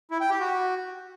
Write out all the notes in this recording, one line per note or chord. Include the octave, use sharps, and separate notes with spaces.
E4
G5
G4
F#4